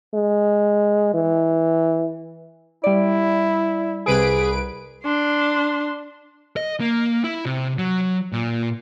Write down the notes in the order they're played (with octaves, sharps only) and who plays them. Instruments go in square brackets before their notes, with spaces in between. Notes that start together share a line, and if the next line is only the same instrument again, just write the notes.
[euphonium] G#3
E3
[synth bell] G3 D5 [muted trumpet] E4
[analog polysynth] C2 B4 D7 [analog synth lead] G#4
[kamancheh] D4 C6
[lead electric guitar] D#5
A#3
E4
C3
F#3
A#2